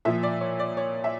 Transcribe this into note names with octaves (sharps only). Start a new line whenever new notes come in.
A#2 F3 E5
D5
C#5
D5
C#5
E5